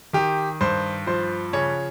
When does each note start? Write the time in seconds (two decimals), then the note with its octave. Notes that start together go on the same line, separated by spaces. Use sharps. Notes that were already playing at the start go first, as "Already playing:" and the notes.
0.13 D#3 G4
0.61 G2 C5
1.06 F3 C5
1.53 C#3 C#5